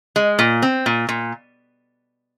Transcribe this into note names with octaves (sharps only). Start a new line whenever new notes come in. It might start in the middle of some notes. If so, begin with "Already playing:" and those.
G#3
A#2
C4
A#2
A#2